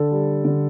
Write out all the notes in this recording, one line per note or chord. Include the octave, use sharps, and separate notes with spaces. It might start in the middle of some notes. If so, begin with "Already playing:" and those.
Already playing: D3 A4
G3
D3